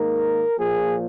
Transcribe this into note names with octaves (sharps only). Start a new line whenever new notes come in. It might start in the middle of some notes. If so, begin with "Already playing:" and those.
Already playing: G#2 D#3 A#3 A#4
A#2 F3 A#3 G#4